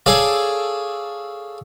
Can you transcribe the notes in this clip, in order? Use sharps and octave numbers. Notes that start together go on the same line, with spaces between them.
G#4 A4 C#5 D5 F5